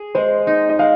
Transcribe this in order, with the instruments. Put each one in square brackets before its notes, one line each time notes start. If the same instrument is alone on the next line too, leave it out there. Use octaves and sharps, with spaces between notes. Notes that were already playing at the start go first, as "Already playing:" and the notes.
Already playing: [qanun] G#4
[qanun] G#3 [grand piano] C5
[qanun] D#4
[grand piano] D#5
[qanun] G#3 [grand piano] F5